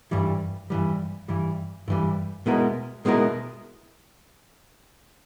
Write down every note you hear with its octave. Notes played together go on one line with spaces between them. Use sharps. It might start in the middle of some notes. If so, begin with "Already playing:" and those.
G2 E3 G3
G2 E3 G3
G2 E3 G3
G2 E3 G3
B2 G#3 B3 E4 A#4
B2 G#3 B3 E4 A#4